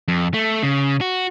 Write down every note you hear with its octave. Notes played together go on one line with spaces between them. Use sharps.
F2
A3
C#3
F#4